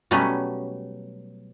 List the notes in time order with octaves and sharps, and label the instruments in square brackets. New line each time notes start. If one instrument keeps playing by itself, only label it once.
[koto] B2 F#3 G3 A3 B3 C#4